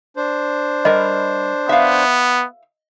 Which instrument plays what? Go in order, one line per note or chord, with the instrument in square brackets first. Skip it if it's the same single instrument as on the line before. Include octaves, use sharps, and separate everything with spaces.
[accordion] D4 C5
[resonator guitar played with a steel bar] G3 A#4 [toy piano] D#5
[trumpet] B3 [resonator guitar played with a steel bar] E5 F5